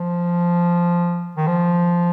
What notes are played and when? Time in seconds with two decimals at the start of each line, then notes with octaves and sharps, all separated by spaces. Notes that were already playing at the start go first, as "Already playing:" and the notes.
Already playing: F3
1.37 D#3
1.47 F3